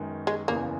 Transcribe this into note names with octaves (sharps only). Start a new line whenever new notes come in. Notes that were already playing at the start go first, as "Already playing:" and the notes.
Already playing: F#2 D#3 G#3 B3
G#3
F#1 E2 C#3 E3 A#3 B3